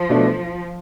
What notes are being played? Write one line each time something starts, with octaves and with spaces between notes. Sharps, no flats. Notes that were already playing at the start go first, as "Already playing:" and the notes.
Already playing: F3
B2 A3 D4 A4